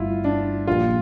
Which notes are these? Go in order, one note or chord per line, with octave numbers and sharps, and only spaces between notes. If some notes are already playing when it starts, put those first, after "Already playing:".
Already playing: G1 G2 A3 E4 F4
D4
A#1 A#2 G3 D4 F4